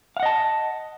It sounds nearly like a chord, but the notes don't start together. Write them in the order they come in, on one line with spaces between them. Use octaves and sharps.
F5 F#5 D#5 A5